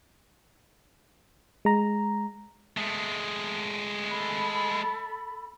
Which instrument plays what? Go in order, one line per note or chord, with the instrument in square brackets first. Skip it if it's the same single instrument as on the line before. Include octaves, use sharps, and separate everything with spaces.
[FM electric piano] G#3 A#5
[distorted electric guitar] G#3 A3
[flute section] A4 B5